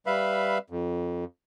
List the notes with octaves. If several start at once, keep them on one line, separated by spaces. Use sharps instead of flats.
G3 B4 E5 F5 B5
F2